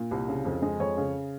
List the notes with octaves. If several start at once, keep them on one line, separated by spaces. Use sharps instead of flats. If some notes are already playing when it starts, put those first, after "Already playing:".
Already playing: A#2
C2
C#3
F2
G#3
F2 C#5
C#3